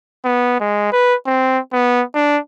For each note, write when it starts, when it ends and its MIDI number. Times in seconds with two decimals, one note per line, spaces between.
0.25 0.60 59
0.60 0.90 56
0.92 1.14 71
1.26 1.58 60
1.72 2.03 59
2.14 2.38 62